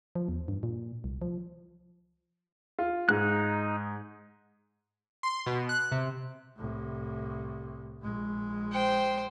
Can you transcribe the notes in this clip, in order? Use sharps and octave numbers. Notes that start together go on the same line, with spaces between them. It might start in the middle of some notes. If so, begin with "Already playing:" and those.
F3
E2
G2
A#2
C2
F3
F4
G#2 D#4 F#6
C6
B2
F#6
C3
C2 A2
A#1 G#3
C5 G5